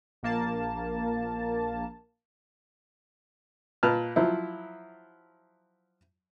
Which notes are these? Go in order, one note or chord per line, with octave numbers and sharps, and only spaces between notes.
A#1 A#3 A5
A#2 B4 A5 F6
F3 F#3 E4